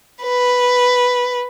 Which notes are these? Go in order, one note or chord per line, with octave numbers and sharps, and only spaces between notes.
B4